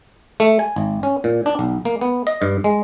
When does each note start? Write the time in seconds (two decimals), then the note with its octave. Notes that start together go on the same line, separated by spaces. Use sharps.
0.40 A3
0.59 G#5
0.76 G#1
1.03 C#4
1.24 A#2
1.46 D4
1.59 B1
1.85 A#3
2.01 B3
2.27 D#5
2.42 G2
2.64 G#3